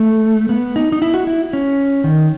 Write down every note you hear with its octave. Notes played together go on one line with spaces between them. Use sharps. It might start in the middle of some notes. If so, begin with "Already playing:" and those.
Already playing: A3
B3
D#4
D#4
E4
F#4
E4
C#4
D#3